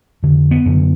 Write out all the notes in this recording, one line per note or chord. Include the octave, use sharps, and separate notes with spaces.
F2 D3
B3
F#2 D3